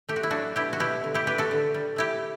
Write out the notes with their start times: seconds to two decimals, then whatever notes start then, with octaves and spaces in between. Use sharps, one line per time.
0.09 A3 G4
0.16 F#4
0.23 E4
0.30 F#3 D4 F#4
0.56 B2 E4 G4
0.73 F#4
0.80 B2 E4 G4
1.04 D3
1.14 E4 G4
1.26 G3 G4 B4
1.38 F#4 A4
1.51 D3
1.74 G3
1.96 A3 E4 G4